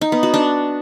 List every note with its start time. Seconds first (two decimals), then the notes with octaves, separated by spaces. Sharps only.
0.01 D#4
0.12 B3
0.23 F#4
0.34 D4